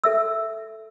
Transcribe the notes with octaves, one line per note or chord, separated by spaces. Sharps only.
A4 E5 E6